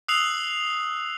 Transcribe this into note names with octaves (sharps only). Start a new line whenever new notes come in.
D#6 E6 F#6 C7 F7 F#7